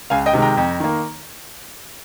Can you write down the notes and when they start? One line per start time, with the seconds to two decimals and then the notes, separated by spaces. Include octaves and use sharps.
0.10 C#2 F5 G#5
0.26 D#5 G5
0.33 C3 D#3 G#3
0.42 G5 A#5
0.57 F2
0.80 D#3 A#3